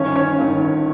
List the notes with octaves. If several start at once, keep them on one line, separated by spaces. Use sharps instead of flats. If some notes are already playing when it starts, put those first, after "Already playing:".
Already playing: G1 G2 D#3 C#4 C#5
C#4 C#5
G1 G2 D#3